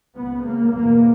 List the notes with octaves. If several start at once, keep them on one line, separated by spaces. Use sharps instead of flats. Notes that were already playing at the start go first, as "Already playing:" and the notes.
C#2 C#3 B3
A#3
E2 B2 A#3